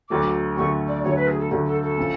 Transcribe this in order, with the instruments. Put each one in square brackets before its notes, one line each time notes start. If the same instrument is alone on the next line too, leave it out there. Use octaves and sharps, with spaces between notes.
[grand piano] D2 D3 F#3 A3 [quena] D6
[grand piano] D2 D3 F#3 A3 [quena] C#6
[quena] D5
[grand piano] D2 D3 F#3 A3 [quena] C#5
[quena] B4
G#4
A4
[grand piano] D2 D3 F#3 A3
[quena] A4
A4
[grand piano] F3 A3 C#4